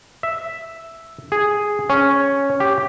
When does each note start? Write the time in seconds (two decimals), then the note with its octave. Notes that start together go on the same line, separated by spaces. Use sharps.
0.23 E5
1.32 G#4
1.90 C#4
2.60 G4